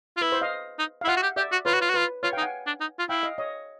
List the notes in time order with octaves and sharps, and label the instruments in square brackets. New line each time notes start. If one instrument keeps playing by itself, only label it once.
[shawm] F4
[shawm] E4 [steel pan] B4
[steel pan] C5
D#5 F5
[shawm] D#4
[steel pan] F5
[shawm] E4
[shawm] F4 [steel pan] E5 F#5
[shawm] F#4
G4
[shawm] G4 [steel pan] D5 E5
[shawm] F#4
[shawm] F4 [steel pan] B4 C#5
[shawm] F#4
F4
F#4
[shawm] F4 [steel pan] B4
[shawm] F4 [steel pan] B4 C#5
[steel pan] F5 G5
[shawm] D#4
[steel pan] F#5 G#5
[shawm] D4
D#4
F4
[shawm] E4 [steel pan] F5 G5
[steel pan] D#5 F5
C#5 D#5